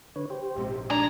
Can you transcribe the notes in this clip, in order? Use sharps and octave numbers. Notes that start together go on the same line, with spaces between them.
D3 B4 C#5
G4 C5
A#1 G#2 C3
G#3 D4 D5 G#5 A#5